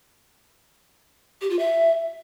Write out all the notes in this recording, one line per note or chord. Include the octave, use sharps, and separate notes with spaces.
G4
F4
E5